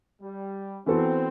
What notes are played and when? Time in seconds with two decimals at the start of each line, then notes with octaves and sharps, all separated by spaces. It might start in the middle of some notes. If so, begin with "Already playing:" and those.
0.22 G3
0.86 E3 B3 C4 F#4 A4